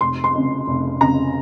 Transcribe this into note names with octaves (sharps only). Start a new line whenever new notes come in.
F1 C6
C6
F2 C#3
F1
F2 C#3 A#5